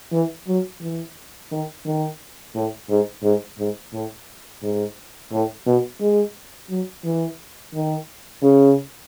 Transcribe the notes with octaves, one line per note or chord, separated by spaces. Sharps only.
E3
F#3
E3
D#3
D#3
A2
G#2
G#2
G#2
A2
G#2
A2
B2
G#3
F#3
E3
D#3
C#3